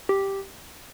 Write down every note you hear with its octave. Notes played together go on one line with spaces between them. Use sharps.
G4